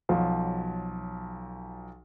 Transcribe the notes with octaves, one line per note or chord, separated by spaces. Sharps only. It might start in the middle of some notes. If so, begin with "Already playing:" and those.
B1 F3 F#3